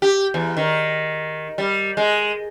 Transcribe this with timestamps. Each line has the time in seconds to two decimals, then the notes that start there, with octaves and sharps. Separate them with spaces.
0.02 G4
0.34 E2
0.57 D#3
1.58 G3
1.97 G#3